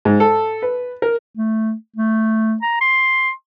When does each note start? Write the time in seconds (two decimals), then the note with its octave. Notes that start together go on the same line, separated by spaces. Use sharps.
0.05 G#2
0.20 A4
0.62 B4
1.02 A#4
1.37 A3
1.96 A3
2.62 A#5
2.81 C6